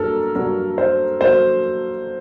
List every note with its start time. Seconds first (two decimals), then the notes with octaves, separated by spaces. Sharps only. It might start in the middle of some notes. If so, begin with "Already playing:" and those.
Already playing: G2 F#3 A#3 A4 A#4
0.35 G2 F#3 A#3 A#4
0.78 C5
1.21 F#3 A#3 C5